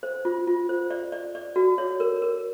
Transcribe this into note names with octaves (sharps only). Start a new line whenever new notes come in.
C5
F4
F4
C5
D5
D5
D5
F#4
C#5
A#4
A#4